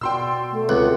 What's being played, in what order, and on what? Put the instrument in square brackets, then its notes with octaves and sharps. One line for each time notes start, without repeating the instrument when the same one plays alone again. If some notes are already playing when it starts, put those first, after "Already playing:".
[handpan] B2 F#4 D5 [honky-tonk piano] G5 C6 E6
[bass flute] A3
[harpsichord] C#2 [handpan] C4 F#4 F#5 [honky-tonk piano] F#6